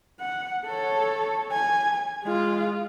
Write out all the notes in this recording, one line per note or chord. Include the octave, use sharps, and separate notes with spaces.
F#5
A4 C#5
G#5
G#3 F4